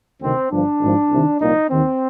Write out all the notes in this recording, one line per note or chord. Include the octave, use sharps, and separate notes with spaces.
D2 C3 D#3 C4
G1 G2 F3 D4
G#1 G#2 F3
C2 C3 D#3
C2 A#2 F3 D#4
D#2 D#3 C4